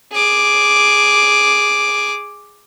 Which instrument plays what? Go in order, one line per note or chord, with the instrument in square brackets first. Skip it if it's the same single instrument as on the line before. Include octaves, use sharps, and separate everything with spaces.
[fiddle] G#4 D6